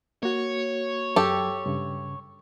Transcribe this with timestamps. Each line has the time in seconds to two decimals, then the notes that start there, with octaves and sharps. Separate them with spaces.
0.23 A#3 F#4 C#5
1.16 F#2 F#3 G4 A4
1.66 G2 C#3